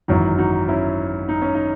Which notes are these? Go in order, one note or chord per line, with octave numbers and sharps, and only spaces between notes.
G#1 F#2 E3 D#4 F#4
D#4 F#4
C#4 E4
D#4
C#4
D#4